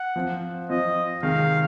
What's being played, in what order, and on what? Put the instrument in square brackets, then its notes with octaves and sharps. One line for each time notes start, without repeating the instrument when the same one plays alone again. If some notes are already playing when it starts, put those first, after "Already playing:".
Already playing: [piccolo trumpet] F#5
[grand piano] F3 C4 F4
[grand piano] F3 C4 F4 [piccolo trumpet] D#5
[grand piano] C3 D#3 G#3 [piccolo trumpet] F5